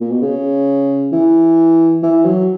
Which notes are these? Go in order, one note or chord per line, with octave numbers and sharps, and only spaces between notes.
A#2
B2
C#3
E3
E3
F#3